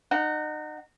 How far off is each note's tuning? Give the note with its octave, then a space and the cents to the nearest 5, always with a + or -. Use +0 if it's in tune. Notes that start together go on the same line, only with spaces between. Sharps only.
D#4 -30 F#5 +0